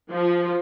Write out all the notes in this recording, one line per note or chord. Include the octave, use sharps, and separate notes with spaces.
F3